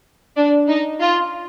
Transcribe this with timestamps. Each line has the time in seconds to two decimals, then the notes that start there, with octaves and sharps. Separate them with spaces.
0.37 D4
0.68 D#4
1.00 F4